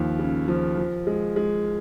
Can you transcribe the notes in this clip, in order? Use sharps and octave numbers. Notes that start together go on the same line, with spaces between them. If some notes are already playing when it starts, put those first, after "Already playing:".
Already playing: D#2 F3
C#3
F3
F3
G#3
G#3